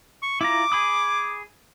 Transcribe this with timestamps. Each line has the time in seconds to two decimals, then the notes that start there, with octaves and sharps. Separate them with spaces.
0.22 C#6
0.41 E4 F4 A#5 D6
0.72 G#4 B5 D#6